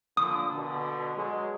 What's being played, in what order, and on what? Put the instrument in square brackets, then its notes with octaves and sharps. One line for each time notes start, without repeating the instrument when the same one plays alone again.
[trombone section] A#2 D3 F3 [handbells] D#6
[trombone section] B2 D3
F#3 G#3